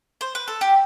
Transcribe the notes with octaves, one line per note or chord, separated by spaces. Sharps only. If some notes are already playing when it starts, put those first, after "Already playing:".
C5
B4
A4
G4